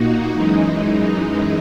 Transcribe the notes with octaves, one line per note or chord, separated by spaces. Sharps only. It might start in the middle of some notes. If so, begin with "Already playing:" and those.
Already playing: A#2 A#3 D#4 F#4
F#2 E3 G#3 D#4